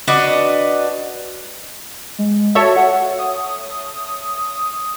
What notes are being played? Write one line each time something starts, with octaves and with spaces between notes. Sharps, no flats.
D4 F#4 B4 D#5
G#3
F#4 A4 C#5 E5
F#5
D#6